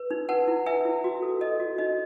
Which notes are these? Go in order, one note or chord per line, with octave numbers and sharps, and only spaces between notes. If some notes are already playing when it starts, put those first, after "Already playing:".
Already playing: B4
D#4
B4 F#5 A5
E4
B4 E5 G#5
E4
F#4
A4
A4 D#5
F#4
D#4 D#5